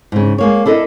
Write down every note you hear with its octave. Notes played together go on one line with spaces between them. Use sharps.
G#2 C#3
G#3 A#3 C#5
D4 E4 A4 A#4 D#5